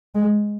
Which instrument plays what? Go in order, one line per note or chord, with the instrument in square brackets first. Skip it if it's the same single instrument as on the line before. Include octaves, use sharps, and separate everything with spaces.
[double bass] G#3